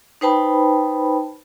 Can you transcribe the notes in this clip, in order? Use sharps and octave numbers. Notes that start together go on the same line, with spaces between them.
D#4 B4 C5 G5 A5 B5